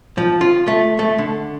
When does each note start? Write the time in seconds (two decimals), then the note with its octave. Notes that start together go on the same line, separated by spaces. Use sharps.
0.18 F3
0.41 F4
0.68 A3
0.99 A3
1.18 D3